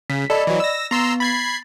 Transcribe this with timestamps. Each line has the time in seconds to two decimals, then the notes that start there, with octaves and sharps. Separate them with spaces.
0.10 C#3 B6
0.30 A4 D5 D#5 B5
0.47 E3 F#3
0.60 E6 A#6
0.91 B3 A#5 C6 E6
1.20 B5 G#6 A6 C7